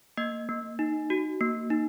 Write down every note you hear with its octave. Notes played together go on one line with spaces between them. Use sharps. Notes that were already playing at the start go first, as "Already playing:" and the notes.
A#3 D#5
A#3
D#4
F#4
A#3
D#4